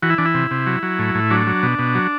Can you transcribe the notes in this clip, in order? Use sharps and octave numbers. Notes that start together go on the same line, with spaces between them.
E3 F#4
E4
E3 D4
E4
C3
C3
F#3
F#3
A2
A2
F#3 D4
F#3
B2
B2
F#3